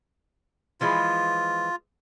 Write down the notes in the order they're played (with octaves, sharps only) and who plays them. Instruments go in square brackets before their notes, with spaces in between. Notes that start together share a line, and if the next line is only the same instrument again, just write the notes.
[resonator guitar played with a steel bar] E3 F3 G#3 [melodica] F4